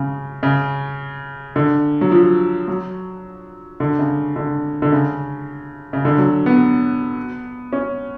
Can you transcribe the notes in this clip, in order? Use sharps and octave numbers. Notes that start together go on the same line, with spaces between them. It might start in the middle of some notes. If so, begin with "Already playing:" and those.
Already playing: C#3
C#3
D3
F#3
F3
F#3
D3
C#3
D3
D3
C#3
C#3
D3
F#3
B3
C#4